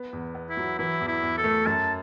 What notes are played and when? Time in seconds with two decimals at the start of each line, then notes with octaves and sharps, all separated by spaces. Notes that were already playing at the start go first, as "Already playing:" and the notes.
Already playing: B3
0.13 E2
0.35 B3
0.50 E4
0.57 F#3
0.79 E3 E4
1.01 E2
1.08 E4
1.22 E2
1.38 A4
1.44 A3
1.66 F#2 A5